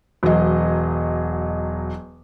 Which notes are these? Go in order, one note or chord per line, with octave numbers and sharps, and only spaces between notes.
E1 F#3 D#5